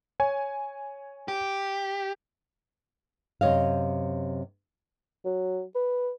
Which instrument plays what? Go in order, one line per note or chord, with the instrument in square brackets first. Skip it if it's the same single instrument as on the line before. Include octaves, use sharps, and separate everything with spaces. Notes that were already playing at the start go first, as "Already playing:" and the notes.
[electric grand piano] C#5 G#5
[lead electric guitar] G4
[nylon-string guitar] F#2 C3 C#5 D#5 F5
[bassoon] F#3
B4